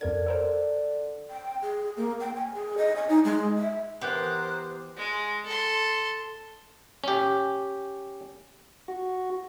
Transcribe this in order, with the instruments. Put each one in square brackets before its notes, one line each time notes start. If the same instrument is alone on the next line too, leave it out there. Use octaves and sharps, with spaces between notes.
[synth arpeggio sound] F2 A#4 G#6 [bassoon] D3
[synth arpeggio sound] A4 A#4 C5
[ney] G5
G#4
A#3
G5
G#5
G#4
D#5
G#5
D#4
G#3
E5
[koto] E3 G4 F5 [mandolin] B3 [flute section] A#4 F#6 [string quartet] C5
[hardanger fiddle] G#3
A4 C6
[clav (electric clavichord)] C#4 G4
[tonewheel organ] F#4